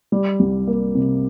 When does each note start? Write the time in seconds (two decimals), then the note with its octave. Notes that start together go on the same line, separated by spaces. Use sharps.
0.12 G3
0.40 C2
0.67 A#3
0.95 C3